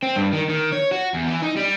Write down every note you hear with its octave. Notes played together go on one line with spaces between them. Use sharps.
C4
G2
D#3
D#3
C#5
F#4
E2
E3
D#4
G3